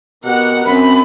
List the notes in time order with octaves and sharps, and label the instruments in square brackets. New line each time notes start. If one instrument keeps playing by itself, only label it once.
[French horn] B2 [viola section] G4 A#4 F#5
[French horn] F#2 [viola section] C4 [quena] B5